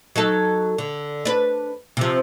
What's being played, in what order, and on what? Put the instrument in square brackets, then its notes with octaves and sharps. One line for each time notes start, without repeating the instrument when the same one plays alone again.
[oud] F#3 D#4 A4
D3
D4 B4
C3 F3